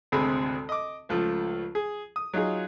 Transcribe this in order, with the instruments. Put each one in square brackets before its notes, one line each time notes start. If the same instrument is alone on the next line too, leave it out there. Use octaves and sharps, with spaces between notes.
[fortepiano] G#1 D2 C3 C4 G#4 B5
D#5 D6
C#2 F3 A3
G#4
D#6
F#3 D#4 F4 G#4